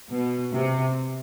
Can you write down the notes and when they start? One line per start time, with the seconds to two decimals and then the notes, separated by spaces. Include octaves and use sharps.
0.12 B2
0.53 C3